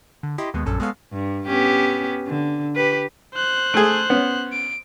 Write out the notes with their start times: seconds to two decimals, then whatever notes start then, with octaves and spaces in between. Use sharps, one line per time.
0.23 D3
0.38 E4 G4 D#5 C6
0.54 D#2 B2 G#3 B3
0.65 A#1 F#2 C#4 A4
0.80 G#3 B3 G#4 A4 C#5 F5
1.12 G2
1.46 B3 C#4 G4
2.27 D3
2.76 G4 B4
3.34 C5 F#6
3.74 A3 G#4
4.10 B3 C#4
4.53 D7